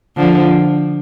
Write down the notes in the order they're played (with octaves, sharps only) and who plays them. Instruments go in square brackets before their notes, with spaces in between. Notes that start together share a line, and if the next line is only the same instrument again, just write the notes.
[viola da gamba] D3 F3